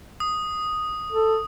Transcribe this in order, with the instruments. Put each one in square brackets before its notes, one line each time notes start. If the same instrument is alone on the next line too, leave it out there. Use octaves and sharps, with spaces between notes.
[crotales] D#6
[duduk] A4